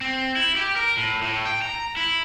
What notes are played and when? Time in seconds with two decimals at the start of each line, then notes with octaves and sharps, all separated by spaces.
0.01 C4
0.36 E4
0.56 G4
0.76 A#4
0.97 A2
1.22 A2
1.45 G5
1.62 A#5
1.97 E4